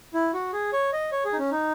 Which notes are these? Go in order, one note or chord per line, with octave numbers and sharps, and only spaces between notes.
E4
F#4
G#4
C#5
D#5
C#5
G#4
D#4
C#4
D#4